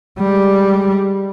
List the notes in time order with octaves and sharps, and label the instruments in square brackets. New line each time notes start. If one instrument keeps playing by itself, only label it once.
[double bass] G3 G#3